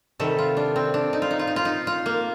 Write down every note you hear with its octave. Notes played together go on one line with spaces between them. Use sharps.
C3 D#3 G3 A4
F4
D4
C4
D4
D#4
F4
D#4
F4
D#4
F4
D#4
F4
A#3